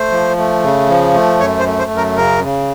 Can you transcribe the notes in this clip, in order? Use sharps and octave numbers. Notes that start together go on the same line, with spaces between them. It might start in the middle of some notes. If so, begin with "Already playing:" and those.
Already playing: A3 C5
F3
A3
C#3
F3
A3
F#2 C#5
C5
A3
C5
F#2
A#4
C#3 A#4
C#3